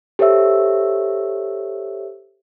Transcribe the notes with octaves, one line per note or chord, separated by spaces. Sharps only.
G4 A4 C5 C#5 E5 E6